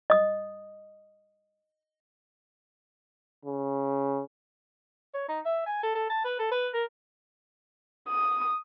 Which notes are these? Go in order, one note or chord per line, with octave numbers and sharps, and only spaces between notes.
D#5 D#6
C#3
C#5
D#4
E5
G#5
A4
A4
A5
B4
A4
B4
A#4
D#6